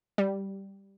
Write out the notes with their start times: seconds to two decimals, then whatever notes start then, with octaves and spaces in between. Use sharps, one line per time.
0.18 G3